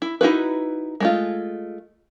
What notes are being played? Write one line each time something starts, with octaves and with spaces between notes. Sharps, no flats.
E4
D#4 E4 F#4 B4
G#3 A3 F4